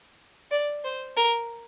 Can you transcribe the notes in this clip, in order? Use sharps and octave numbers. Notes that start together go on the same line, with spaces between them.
D5
C5
A#4